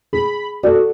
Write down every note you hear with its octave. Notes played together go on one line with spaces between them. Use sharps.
G#4 B5
F#4 A4 D5